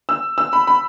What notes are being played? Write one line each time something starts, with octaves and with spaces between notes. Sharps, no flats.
E6
E6
B5
B5